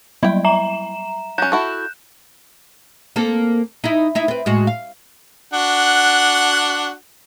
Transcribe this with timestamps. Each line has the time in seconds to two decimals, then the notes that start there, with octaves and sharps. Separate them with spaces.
0.23 F#3 G3 E4 G5
0.44 E5 A#5 E7
1.38 F#3 C#4 F#6 G6 E7
1.52 E4 F#4 A4
3.16 A#3 C4 A4
3.84 D#4 E4
4.15 D#4 E4 E5
4.28 C4 B4
4.46 A2 G#3 F#4
4.67 F5
5.53 D4 F#4 F#5